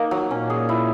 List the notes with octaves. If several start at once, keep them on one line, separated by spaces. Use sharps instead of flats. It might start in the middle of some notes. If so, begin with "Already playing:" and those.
Already playing: A#3 D#4
F#3
A#2 C#4
G#4
E4